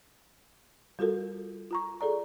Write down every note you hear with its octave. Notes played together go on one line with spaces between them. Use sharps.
G3 F4 F#4 A4 A#4
F4 A#5 C#6
G#4 A4 D5 A#5